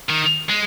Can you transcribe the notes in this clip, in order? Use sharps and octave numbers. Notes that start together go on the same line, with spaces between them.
D#3
G#3